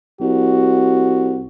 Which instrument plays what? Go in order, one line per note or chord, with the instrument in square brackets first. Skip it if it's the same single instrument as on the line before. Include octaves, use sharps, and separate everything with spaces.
[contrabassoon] C2 [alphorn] F#4